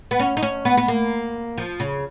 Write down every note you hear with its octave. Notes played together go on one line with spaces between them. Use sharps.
B3
C#4
D#4
C#4
B3
B3
A#3
F3
C#3